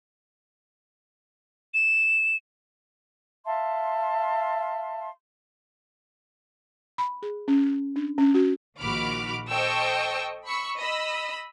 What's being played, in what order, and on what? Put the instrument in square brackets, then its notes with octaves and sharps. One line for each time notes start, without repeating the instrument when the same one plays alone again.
[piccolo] E7
[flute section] E5 F5 A5 C6
[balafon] B5
G#4
C#4
D4
C#4
F#4
[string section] A#1 D#3 F#4 B5 D6 F6
A4 C5 D#5 G5 C#6 E6
B5 C#6 E6
D#5 B5 E6